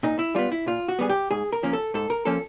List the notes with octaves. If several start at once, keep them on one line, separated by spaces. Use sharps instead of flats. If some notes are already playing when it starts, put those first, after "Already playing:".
A#2 D#4
E4
G3 B3 F4
E4
A#2 F4
F#4
G3 B3 G#4
G4
G#2 G#4
A#4
F3 A#3 C#4
A4
G#2 A4
A#4
F3 A#3 C#4 A4